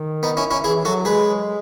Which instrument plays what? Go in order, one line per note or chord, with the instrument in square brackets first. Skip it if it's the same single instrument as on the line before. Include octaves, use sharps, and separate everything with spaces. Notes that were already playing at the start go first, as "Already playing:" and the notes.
Already playing: [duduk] D#3
[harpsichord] B3 D#4
C#4 E4
C#4 E4
[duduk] E3 [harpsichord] E4 G#4
[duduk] F#3 [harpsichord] F#4 A4
[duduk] G#3 [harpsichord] G#4 B4